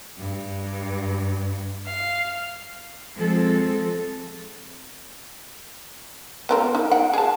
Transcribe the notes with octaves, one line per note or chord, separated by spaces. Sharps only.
G2
F5
F3 G#3 C4 A4
B3 C4 A#4
D#4
F#5 G5
G#4 A5